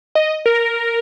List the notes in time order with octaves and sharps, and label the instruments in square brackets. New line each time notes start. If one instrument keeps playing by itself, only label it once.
[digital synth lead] D#5
A#4